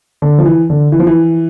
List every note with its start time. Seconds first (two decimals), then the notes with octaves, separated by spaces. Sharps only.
0.22 D3
0.38 F3
0.46 E3
0.70 D3
0.92 E3
1.00 F3
1.07 E3